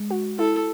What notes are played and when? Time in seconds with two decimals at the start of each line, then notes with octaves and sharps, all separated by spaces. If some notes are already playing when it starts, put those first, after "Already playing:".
Already playing: G#3
0.11 F#4
0.38 E4 A4